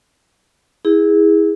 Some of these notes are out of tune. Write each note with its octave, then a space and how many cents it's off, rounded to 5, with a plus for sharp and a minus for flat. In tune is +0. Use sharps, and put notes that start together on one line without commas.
E4 -20 G#4 -15